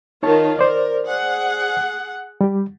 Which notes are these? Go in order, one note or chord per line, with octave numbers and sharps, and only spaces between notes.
D#3 D#4 F4 C#5 A5
A#4 C5 D5
G#4 F#5
G3 G4